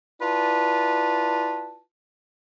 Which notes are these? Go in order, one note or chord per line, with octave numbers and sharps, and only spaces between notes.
E4 F4 B4 D5 A5